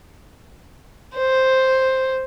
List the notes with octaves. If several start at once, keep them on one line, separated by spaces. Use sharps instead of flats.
C5